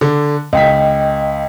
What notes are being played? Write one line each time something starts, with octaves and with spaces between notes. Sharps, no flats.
D3
C#2 D#5 G5 B6